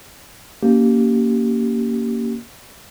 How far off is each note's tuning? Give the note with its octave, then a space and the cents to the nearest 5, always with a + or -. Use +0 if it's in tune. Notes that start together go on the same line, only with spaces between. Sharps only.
A#3 +0 C#4 +20 G4 -15